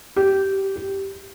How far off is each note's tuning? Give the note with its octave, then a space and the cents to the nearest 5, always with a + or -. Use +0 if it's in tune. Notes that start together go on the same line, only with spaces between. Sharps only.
G4 -15
G4 -5